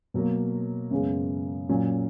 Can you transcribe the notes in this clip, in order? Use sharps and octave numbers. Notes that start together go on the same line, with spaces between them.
B2 F#3 A#3
F#2 C#3 G#3 B3
A#2 F#3 C#4